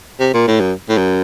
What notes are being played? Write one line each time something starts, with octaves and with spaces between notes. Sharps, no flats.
C3
A#2
A2
F#2
A2
F#2